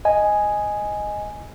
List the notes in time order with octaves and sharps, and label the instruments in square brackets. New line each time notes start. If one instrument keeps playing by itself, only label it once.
[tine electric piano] D#5 G#5